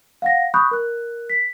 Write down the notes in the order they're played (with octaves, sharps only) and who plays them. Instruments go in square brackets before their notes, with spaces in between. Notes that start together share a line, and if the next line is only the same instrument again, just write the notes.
[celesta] F5 F#5 A#6
B5 C#6 D#6 F#6 G6
A#4 F#6
B6